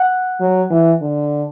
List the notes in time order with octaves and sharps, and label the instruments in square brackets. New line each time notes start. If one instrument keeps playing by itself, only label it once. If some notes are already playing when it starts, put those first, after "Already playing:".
Already playing: [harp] F#5
[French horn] F#3
E3
D3